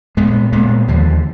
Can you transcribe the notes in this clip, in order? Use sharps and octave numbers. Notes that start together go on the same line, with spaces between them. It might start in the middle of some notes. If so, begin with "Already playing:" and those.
A#2 G#3 B3
A#2 G#3 B3
D#2 D3 F3